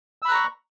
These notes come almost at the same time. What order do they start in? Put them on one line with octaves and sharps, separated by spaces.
E6 B5 F#6 A#5 C#6